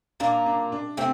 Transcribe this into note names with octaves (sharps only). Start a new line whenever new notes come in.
A#2 A#3 D4
D4
D4
C3 A3 C4